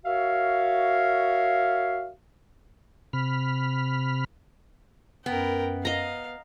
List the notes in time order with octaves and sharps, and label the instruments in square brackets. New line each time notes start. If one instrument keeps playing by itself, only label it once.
[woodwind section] F#4 A#4 C#5 E5 F5
[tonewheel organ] C3 B5 F6
[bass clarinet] F#2 [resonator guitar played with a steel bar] B3 [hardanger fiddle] A#4 G5
[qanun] D#5 A#5 [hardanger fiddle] F5